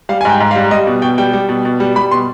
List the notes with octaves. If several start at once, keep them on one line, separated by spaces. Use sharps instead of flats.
G3 F5
G#5
G#2 G5
G#2
F5
G3
G3 D#5
B2
B2 G5
G3 G5
G3
B2
B2
G3
G3 B5
B2 C6